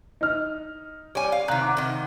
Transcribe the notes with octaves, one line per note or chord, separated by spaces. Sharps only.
D#4 F6
G3 C#5 G#5
F5
C3 D#3 A#5 F#6
F#5 A#5 D6
C3 D#3